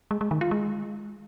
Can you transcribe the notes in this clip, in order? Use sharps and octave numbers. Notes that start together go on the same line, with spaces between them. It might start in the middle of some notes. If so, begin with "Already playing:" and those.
G#3
G#3
D#3
F4
G#3